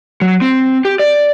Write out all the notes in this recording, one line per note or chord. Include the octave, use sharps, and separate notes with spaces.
F#3
C4
G4
D5